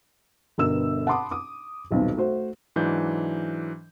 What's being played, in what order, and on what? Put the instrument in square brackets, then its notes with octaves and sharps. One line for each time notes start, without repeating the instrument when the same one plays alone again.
[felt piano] G1 G2 B2 A#4 E6 E7
F#5 A5 B5 C6 D6 D#6
D6 D#6
D#1 B1 B2 C4
A3 F#4 C5
[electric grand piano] G#2 E3 F#3 D4 G6